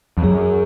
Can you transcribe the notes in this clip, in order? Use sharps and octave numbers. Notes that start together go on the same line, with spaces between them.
F2
F#2 G#4